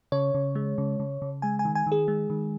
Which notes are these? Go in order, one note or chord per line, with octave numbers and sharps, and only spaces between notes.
C#3 C#5
C#3
G#3
C#3
C#3
C#3
G#3 G#5
G#5
D#3
G#5
D#3 G#4
G#3
D#3